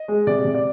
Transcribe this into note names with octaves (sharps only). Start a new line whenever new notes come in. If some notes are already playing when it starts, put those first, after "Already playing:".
Already playing: D#5
G#3
C3 D5
C3
D5